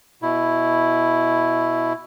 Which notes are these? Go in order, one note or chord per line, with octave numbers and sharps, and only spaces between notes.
B2 E4